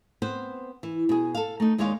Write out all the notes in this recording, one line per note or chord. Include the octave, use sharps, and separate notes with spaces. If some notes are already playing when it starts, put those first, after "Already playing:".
B3 C4 B4 C5
E3
B2 G#4
A4 F5
A3 D#4
D#2 G#3 D#4 C#5 D5 F5